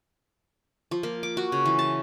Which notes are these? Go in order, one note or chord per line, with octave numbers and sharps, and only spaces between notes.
F3
A#3
D6
F#4
C#3
E3
A5